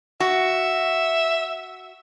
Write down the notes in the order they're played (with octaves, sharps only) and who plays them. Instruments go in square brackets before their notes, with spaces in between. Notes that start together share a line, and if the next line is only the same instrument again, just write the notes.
[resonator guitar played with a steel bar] F#4 [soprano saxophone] E5